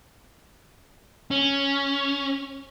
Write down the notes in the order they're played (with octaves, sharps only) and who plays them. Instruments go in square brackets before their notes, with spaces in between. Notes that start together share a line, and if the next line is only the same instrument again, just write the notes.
[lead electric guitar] C#4